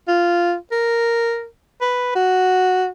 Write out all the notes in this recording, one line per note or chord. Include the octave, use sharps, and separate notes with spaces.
F4
A#4
B4
F#4